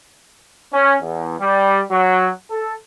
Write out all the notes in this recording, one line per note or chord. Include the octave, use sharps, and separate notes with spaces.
C#4
E2
G3
F#3
A4